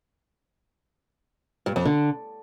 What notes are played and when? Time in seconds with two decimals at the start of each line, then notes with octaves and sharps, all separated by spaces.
1.66 G2
1.76 F2
1.85 D3